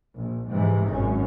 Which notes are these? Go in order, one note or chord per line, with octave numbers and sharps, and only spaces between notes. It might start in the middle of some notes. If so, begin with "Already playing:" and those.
A#1
G#2 C3 E3
G#1 F#2 C#4